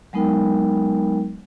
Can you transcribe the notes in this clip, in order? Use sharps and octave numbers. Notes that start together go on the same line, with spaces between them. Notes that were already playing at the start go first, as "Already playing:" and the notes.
F#3 G#3 B3 D#4 A#4 G5